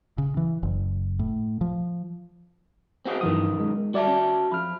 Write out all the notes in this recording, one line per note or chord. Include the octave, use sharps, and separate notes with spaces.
C#3
E3
F#1
A2
F3
C4 F#4 G#4
B1 G2 D#3 E3 D#6
G#3
G3 F#4 D5 E5 A5
C#4
F2 B5 F6